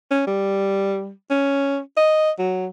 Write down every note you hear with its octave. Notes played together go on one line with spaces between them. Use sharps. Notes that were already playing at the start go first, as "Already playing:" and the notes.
C#4
G3
C#4
D#5
F#3